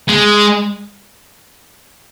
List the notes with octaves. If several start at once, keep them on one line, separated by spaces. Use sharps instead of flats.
G#3